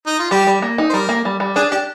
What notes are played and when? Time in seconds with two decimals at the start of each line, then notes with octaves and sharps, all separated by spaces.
0.07 D#4
0.19 F4
0.31 G3 G4
0.47 G3
0.62 A#3
0.78 D#4
0.90 C5
0.93 G3 A#4
1.09 A#3
1.25 G3
1.40 G3
1.56 D4 G#4
1.71 D4 G4